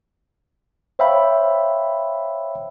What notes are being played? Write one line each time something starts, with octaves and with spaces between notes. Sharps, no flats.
C5 C#5 E5 F5 G5 B5